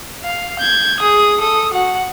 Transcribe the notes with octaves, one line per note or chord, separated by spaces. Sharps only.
F5
G6 G#6
G#4 D#6
A4 D#6
F#4 F#5